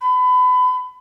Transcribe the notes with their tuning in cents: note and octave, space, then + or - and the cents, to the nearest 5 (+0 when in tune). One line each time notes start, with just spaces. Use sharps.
B5 +30